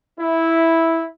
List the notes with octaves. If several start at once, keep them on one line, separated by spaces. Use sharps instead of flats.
E4